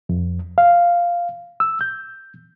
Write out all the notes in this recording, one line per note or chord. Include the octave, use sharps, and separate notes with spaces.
F2
F5
E6
G6